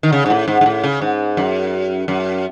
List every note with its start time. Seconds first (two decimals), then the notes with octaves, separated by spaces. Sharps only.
0.03 D#3
0.12 C#3
0.26 G#2
0.30 A2
0.48 G#2
0.61 G#2
0.66 A2
0.84 C#3
1.02 G#2
1.37 F#2
2.08 F#2